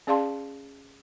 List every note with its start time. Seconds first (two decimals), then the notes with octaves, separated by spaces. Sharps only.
0.07 C#4 G#4 D5 F5 A5 C6